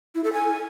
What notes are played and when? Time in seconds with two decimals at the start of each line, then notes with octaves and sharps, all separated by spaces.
0.15 E4
0.24 A4
0.33 G#5